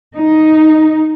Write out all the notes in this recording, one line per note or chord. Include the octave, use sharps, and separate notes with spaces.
D#4